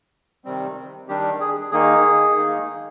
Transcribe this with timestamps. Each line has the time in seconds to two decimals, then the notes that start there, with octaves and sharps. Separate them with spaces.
0.45 C3 D#3 G3 C4
1.08 D#3 G3 D4 G4
1.40 G#4
1.71 D#3 A#3 D#4 G#4
2.35 D#3 A#3 D#4